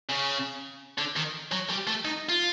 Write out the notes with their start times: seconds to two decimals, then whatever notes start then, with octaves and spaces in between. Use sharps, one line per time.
0.10 C#3
0.98 D3
1.16 D#3
1.52 F#3
1.70 G3
1.87 A3
2.05 D#4
2.29 F4